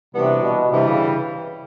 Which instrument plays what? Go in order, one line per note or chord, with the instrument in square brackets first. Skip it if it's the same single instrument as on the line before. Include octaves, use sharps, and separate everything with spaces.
[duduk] C3 [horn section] E3 G3 B3 D4 F#4
[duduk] B2
[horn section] G2 E3 G3 [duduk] C3
[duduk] C#3